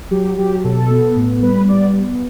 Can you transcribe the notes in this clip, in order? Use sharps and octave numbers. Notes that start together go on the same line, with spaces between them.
F#3 G4
F#3 G4
B2 A4
B3
A2
G3 B4
B3 D5
B3